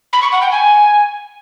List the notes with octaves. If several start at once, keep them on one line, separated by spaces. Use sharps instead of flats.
B5
C#6
F#5
G5
G#5